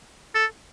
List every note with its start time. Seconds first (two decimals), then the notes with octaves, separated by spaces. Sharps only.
0.35 A4